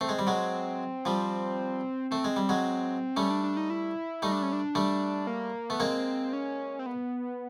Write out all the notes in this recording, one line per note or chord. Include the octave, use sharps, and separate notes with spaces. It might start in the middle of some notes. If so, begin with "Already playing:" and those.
A3 C4
G#3
G3
F#3 G#3
F3 G3
A3 C4
G#3
G3
F#3 G#3
G3 A3 C#4
D4
D4
D#4
E4
G3 A3 D#4
D4
C#4
D4
G3 A3
A#3
A3 B3
G#3 A#3 C4
C#4
C4
B3